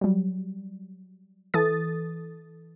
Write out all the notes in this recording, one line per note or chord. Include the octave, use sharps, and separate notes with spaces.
F#3 G3
E3 A4 D#6 A6